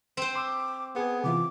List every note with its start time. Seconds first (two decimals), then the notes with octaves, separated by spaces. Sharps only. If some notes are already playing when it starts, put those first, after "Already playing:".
0.17 C4 C5
0.35 C6 D6 E6
0.96 B3 G#4
1.24 C3 E3 F4 D6